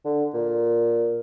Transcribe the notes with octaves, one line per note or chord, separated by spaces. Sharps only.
D3
A#2